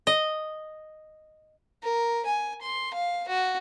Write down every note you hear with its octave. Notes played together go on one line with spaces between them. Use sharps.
D#5
A#4
G#5
C6
F5
F#4